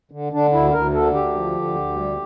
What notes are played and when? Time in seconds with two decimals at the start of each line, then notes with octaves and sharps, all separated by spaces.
0.11 D3
0.32 D3 D4
0.53 D2 E4
0.73 D2 A#4
0.93 D3 A4
1.14 D2 G4
1.34 F3
1.55 D3
1.75 D2
1.96 G3